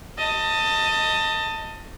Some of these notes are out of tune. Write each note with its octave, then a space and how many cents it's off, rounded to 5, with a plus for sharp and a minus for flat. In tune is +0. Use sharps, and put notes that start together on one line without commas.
D#5 +10 A5 +25